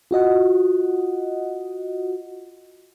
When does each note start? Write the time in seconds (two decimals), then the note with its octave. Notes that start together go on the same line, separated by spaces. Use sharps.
0.11 F4 F#4 D#5 F#5